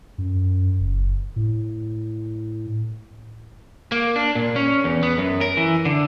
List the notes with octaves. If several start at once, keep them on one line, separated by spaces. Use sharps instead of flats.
F#2
F#1
A2
A#3
D4
A#2
C#4
E2
B3
F#2
A#4
E3
D3